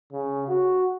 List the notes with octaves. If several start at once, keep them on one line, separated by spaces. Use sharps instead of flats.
C#3
F#4